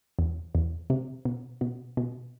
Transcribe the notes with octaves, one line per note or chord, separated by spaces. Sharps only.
E2
E2
C3
B2
B2
B2